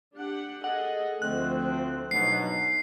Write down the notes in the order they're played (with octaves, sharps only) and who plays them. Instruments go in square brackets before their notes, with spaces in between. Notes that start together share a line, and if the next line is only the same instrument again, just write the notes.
[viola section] D4 G4 F#5
[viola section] G#4 A4 D#5 [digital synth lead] F#5
[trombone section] D2 C4 [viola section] F3 A3 [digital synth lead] F#6
[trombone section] G2 B2 F#3 [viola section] D#4 [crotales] C7